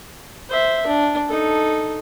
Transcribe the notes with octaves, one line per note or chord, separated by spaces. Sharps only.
C5 E5
D4
D#4 A4